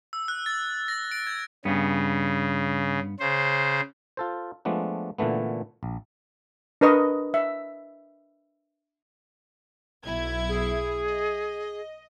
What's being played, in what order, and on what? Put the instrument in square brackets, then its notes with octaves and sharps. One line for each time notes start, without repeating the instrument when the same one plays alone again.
[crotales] E6
F#6
A6
A#6
D7
G#6
[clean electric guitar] G2 B3 [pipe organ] C#3
[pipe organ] C#3 C5
[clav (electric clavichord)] F4 A4 C5
F3 G#3 A3 B3 D4
A#2 D3 E3 A3 B3
A#1
[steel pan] D4 A#4 B4 D#5 C#6
E5
[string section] B1 E4 G#6
[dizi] G#4
[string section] D#5